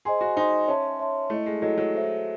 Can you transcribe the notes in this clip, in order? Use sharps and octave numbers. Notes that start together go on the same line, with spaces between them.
G#4 C5 D#5 G#5 C6
F#4
D#4 C5 D#5 G#5 C6
C#4 C#5 E5 A5 C6
C#5 E5 A5 C6
A3 E4 A4 D#5
G#3
F#3 E4 A4 D#5
F#3
A4 C5 E5